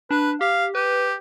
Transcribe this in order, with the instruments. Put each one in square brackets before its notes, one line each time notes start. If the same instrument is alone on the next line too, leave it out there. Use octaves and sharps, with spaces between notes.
[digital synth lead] D4 [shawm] B4
[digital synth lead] G4 [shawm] F5
[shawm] G4 [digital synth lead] B4